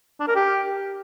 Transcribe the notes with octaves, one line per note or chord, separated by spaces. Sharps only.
D4
A#4
G4